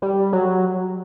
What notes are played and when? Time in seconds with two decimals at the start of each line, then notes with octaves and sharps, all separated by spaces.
0.02 G3
0.33 F#3